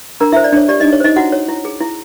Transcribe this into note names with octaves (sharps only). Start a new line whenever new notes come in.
D4 A#4 A#5
E4 E5
C5
D5
D4 C#5
G4 D5
D#4 D#5
D4
C#5
D#4 C5 D#5
E4 F#4 F#5
C#5
E4
G#4
E4